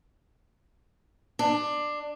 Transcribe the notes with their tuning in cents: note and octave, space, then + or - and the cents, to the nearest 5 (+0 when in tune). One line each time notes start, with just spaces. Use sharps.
D4 +15